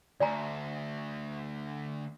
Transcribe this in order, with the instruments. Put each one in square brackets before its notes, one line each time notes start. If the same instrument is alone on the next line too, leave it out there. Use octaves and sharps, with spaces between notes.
[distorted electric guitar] D2 [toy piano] D5 G#5 A#5